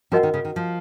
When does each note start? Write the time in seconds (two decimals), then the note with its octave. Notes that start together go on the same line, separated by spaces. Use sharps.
0.12 F3 C#4 F#4 A#4 D#5 F#5
0.23 D#3
0.34 C#3
0.45 D#3
0.56 F3